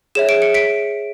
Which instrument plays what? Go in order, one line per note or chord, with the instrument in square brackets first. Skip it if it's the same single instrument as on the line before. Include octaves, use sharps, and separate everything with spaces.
[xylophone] G#4 C#5 E5 E7
D7
C#7
B6 D7